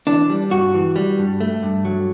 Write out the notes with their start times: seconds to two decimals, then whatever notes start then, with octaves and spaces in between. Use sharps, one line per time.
0.07 E3 D4
0.30 G3
0.51 G2 F#4
0.74 E3
0.96 G3
1.19 G2
1.40 A3
1.63 G2
1.85 F#3